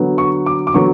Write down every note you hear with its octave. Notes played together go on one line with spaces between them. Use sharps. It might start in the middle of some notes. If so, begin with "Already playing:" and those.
Already playing: D3 F#3 B3
C#6
D6
D6
D3 F#3 B3 C#6